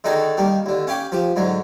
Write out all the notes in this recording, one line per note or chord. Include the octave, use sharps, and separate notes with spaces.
D3 D#3 D#4 F#4 G#4 A4
D#3 G3 A#3
D#2 D3
C#4 F5 G5 B5 D6
F3 G4
G#2 D3 F#3